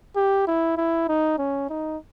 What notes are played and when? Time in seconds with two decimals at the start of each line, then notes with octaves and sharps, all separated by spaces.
0.16 G4
0.47 E4
0.77 E4
1.08 D#4
1.39 C#4
1.70 D#4